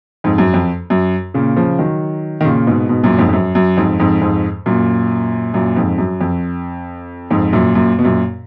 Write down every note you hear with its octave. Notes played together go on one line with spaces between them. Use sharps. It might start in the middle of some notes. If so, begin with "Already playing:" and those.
F2 G#2
F#2
F2
F#2
A#2 C#3
C#3 F3
D#3 F#3
D#3
A#2 C#3
G#2 B2
G#2 B2
F#2 A#2
F2 G#2
F2
F#2
F#2
F2 G#2
F2 G#2
F2 G#2
F#2 A#2
F#2 A#2
F2 G#2
F#2
F2
F2 G#2
F#2 A#2
F#2 A#2
B2
F#2 A#2